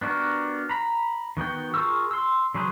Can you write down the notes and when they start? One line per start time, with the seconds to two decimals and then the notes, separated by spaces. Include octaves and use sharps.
0.01 B3 D4 F#4 G4 A#4
0.69 A#5 B5
1.37 D#3 B3 F#4 G5
1.74 F4 G#4 A#4 C#6 E6
2.11 C6 E6
2.54 C#3 F#3 G#4 B4 C5